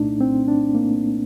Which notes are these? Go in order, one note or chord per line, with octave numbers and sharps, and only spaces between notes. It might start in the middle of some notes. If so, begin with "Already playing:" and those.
Already playing: C2 A#2 A3 D4 D#4
C4
D4
A#3